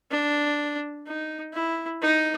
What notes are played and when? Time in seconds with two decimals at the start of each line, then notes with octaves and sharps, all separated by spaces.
0.11 D4
1.07 D#4
1.53 E4
2.02 D#4